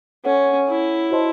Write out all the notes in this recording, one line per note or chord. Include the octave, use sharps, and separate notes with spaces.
C#4 A4 C#5 F#5
E4
F#4 C5 D#5 A5 C6